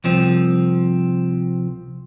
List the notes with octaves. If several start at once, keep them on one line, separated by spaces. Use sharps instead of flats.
C2 F3 C4